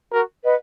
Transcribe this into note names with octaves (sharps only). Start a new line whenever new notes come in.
F#4 A#4
B4 D#5 F#5